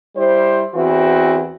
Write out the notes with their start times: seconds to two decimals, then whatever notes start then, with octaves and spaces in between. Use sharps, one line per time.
0.16 G3 E4 C5
0.75 E2 E3 C4 E4 F#4